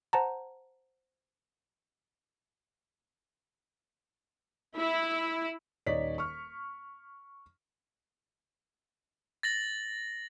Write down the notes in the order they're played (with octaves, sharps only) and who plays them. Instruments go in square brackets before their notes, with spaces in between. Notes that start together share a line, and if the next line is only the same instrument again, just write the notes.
[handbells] C5 F#5 A5 A#5
[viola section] E4
[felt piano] D#1 D#4 C#5 D5 B6
C#6 F6
[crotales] A6 A#6 F#7